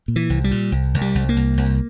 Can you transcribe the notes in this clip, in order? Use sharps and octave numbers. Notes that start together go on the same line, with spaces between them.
A#2
E3
C2
G3
A#2
C2
C2
G3
C2
A#3
C2
C2